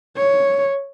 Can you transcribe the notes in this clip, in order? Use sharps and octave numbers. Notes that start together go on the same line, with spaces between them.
C#5